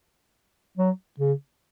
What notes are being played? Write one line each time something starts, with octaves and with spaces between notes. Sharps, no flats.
F#3
C#3